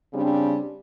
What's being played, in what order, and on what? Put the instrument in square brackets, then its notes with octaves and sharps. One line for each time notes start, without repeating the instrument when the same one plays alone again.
[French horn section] C#3 G3 C4 D4